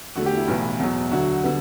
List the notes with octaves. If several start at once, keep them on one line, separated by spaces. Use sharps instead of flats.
E2 D3 A3 F#4
G4
E4
B1 A2 E3 B3
E2 B2 F#3
D2 D3 F#3 F#4
D3 G3 B3